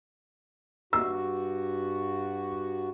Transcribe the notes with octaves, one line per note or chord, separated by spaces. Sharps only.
G2 F#4 E6